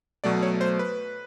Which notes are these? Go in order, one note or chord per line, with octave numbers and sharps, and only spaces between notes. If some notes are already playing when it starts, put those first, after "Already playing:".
B2 F#3 A3 D5
C#5
C5
B4